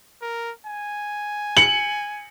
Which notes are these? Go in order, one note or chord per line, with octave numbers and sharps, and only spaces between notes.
A#4
G#5
C#7 F#7